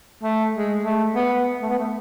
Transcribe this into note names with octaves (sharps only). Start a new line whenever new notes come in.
A3
G#3
A3
B3
A3
B3
A3